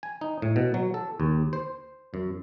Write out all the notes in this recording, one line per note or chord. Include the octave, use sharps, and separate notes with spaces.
G#5
D#4
A2
B2
F#3
A4
D#2
C5
F#2